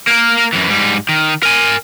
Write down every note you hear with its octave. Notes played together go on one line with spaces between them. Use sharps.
A#3 A#4
F#2 E3
G#2 G3
D#3
A#4 G#5